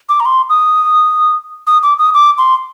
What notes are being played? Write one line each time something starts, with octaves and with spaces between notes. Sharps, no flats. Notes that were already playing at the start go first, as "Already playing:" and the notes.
D6
A#5
C6
D#6
D#6
D6
D#6
D6
C6